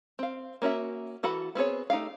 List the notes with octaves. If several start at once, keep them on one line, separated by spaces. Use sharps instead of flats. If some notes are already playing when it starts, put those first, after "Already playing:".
C4 F5
A#3 C#4 F#4 E5
E3 F#4 A4 F#5 B5
B3 C4 G#4 C#5
A3 D#4 G4 F5